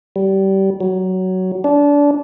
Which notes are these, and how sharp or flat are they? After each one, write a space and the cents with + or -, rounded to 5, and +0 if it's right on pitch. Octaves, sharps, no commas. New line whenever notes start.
G3 -25
F#3 +10
D4 -25